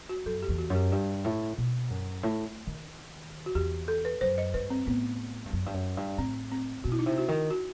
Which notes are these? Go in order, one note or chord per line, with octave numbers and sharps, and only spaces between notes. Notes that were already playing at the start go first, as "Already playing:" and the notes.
F#4
F#2 A4
G4
E2
F#4
F#2
G4
G2 G4
A2
B2
F#2
A2
D#3
F#4
E2 G4
A4
B4
F#2 C5
D#5
G2 B4
C4
A2 B3
G2
F#2
G2
F#2
G2
A2 C4
C4
B2 F#4
E4
D#4
C3 E4
F#4
D#3
F#4